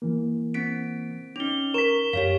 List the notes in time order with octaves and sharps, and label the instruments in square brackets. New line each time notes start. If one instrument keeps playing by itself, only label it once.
[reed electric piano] E3 A#3
[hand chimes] C4 B6 D7
[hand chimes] C#4 D#4 [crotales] F7 G7
[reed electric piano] A#4 [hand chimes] C#6 [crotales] B6 E7
[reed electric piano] F#2 [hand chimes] G4 C#5 F5 [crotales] B6